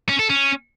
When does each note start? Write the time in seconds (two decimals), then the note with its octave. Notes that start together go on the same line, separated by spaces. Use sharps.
0.09 C#4
0.19 A4
0.29 C#4